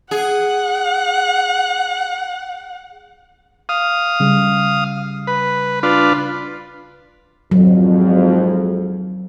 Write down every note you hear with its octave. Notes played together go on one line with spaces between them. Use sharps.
G#4 F#5
F5 D#6
C#3 G3
B4
D4 F4 B4
G#1 F2 F#3